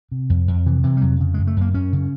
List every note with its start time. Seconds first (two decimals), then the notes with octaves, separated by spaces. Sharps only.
0.11 C3
0.30 F2
0.48 F2
0.66 C3 E3
0.84 C3 E3
0.97 G3
1.01 F2 F#3
1.20 C#3
1.34 F#2 G#3
1.47 A3
1.56 F#2
1.61 A#3
1.74 F#2 C#4
1.93 C#3